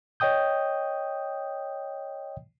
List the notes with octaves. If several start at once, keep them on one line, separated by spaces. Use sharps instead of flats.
C#5 D#5 G5 D#6 G6